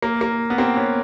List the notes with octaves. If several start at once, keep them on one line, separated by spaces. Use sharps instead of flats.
A#3
A#3
B3
A#3 C4
B3 C#4